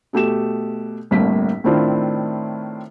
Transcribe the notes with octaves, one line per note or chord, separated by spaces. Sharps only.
B2 A3 G4 E7
G1 C2 A2 A#3 B6
A2 D#3 C4 D4 E4 F4